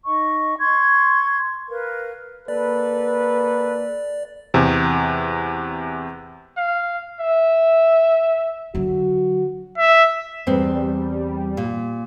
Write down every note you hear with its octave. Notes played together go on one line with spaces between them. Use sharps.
D#4 D#5 C#6
C6 C#6 G#6
A#4 B4 F5
A#3 A4 B4 D5
E2 C3
F5
E5
D3 F#3 F#4
E5
E2 G3 C4
A#2